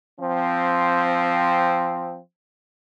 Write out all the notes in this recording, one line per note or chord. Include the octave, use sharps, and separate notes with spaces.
F3 C4